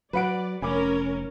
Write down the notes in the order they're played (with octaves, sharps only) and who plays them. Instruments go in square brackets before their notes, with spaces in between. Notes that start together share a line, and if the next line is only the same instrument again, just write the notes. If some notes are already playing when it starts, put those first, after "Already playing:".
[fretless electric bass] F#3 [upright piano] B4 F#5 D7 [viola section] D5
[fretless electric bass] F1 [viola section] C#4 A#4 [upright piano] G#5 B5 D6